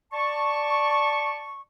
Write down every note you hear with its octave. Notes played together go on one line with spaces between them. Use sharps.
D5 A5 C#6